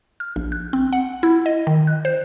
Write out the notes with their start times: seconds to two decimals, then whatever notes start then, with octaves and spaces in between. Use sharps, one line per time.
0.20 F6
0.36 A#1
0.52 F#6
0.73 C4
0.93 F#5
1.23 E4
1.46 D#5
1.67 D#3
1.87 F#6
2.05 C5